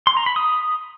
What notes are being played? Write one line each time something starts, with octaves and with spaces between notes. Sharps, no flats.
C6
A#5
B5
D#6